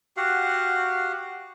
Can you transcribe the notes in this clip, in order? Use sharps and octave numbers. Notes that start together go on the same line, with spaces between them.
F#4 G4 F5 F#5